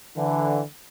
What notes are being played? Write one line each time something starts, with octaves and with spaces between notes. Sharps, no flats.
D3 E3